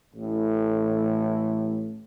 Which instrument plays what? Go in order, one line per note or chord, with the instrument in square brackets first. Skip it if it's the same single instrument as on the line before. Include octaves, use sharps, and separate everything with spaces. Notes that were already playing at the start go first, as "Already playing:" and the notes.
[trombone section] A1 A2